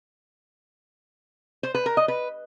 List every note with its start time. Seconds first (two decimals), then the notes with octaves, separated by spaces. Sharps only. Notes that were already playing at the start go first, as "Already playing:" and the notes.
1.63 C5
1.75 B4
1.86 A#4
1.97 D#5
2.08 B4